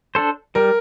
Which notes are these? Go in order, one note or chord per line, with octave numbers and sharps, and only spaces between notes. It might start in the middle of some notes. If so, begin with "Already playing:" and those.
D4 A4 C5
G3 A#4